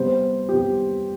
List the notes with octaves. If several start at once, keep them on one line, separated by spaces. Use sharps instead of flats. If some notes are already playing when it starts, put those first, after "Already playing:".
Already playing: C3 G3 B3 C5
C3 G3 B3 G4